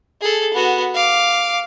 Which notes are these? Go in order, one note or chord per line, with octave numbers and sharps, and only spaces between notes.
G#4 A4
B3 F#4
F5 D6